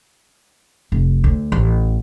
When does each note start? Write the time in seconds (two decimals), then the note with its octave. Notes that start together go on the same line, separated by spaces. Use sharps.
0.92 F1
1.24 D2
1.52 A1